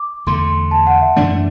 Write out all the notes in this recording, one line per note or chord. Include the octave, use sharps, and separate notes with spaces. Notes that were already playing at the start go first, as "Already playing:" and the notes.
Already playing: D6
E2 D3 A3 C6
A5
F#5
E5
F#2 E3 A3 D4 D5